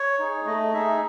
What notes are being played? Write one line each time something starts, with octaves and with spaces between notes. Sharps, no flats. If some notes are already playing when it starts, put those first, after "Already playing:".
Already playing: C#5
D#4 G#4
A3 D#5
D#4 G#4 E5